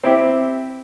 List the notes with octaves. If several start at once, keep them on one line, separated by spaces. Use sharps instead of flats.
C4 E4 G4